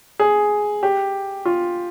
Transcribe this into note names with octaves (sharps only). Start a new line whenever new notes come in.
G#4
G4
F4